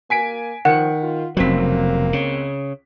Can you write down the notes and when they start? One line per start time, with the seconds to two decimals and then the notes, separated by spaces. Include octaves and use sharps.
0.10 A#3 G#5 B6 D7
0.65 D#3 F3 F#5
1.03 F4
1.37 F1 C#2 F#3 A#3 C4 B6
2.13 C#3